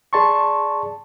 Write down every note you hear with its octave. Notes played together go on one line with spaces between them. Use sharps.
G#4 D5 A5 C6 C#6